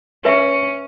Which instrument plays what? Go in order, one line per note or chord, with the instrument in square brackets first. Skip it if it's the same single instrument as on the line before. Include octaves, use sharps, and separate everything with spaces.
[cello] C#4 [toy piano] B4 E5